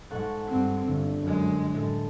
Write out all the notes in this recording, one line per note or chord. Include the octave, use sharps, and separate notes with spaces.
G#2 A4 F#5 C#6
G2 C4
G1 G2 D3
F#2 G#3
A2 A4